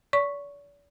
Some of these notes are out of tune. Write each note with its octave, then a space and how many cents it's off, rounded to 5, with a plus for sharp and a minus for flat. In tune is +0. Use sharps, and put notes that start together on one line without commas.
D5 -45 C#6 +0